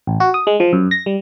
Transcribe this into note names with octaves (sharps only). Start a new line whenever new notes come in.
A1
F#4
D#6
G#3
F3
F#2
A#6
G3